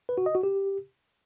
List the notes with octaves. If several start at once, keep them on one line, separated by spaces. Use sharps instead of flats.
B4
F#4
D#5
F#4
G4